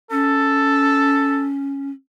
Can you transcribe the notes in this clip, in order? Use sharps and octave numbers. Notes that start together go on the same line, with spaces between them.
C#4 A4